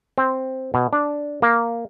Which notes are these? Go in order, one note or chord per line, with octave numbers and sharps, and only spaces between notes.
C4
B2
D4
A#3